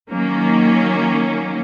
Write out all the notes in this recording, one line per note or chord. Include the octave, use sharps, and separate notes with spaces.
D#3 F#3 A#3 C#4